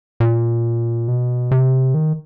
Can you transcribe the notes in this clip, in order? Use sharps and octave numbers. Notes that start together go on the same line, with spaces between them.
A#2
B2
C3
D#3